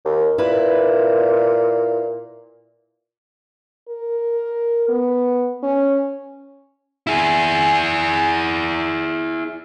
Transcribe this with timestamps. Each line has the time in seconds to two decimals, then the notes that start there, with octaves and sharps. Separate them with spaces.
0.05 D#2
0.38 A#2 E4 B4
3.89 A#4
4.89 B3
5.63 C#4
7.07 E4 G#4